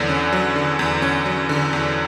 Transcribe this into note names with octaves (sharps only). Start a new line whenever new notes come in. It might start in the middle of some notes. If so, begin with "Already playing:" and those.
Already playing: E2 D3 F#3
C#4
F#3
D3
E2
C#4
F#3
D3
E2